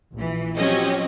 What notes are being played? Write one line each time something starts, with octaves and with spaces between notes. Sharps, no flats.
A#1 E3
F3 F#3 C4 C#4 G4 D#5